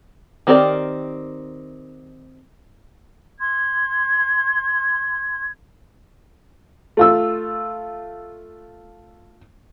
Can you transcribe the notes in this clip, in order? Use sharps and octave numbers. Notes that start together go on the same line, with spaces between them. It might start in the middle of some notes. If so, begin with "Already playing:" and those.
D#3 C4 G4 A#4 D5
C6 G#6
A3 F4 E6